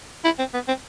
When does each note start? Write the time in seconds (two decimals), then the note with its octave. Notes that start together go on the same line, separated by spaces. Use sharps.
0.25 E4
0.39 C4
0.54 B3
0.68 C4